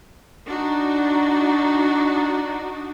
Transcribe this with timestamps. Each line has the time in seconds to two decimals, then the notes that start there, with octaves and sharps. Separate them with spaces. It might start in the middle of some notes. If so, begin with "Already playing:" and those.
0.47 D4 D#4 F#4